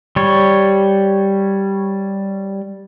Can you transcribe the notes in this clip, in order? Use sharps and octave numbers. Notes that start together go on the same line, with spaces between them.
G3 C#5